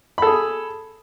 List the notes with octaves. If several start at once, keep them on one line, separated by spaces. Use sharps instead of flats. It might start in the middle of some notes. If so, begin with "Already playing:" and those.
G#4 A4 B5